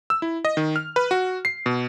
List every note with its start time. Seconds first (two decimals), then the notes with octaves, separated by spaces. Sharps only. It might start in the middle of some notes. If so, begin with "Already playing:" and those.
0.10 E6
0.22 E4
0.45 D#5
0.57 D#3
0.76 F6
0.96 B4
1.11 F#4
1.45 C7
1.66 B2